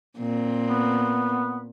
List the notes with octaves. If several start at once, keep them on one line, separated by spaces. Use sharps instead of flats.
A#2 C4
B3